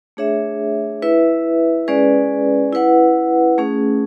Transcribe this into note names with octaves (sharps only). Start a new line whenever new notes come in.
A3 D4 G#4 C#5 E5
E4 B4 E5
G#3 C#4 G#4 B4 D5
E4 B4 F#5
A3 C#4 G#4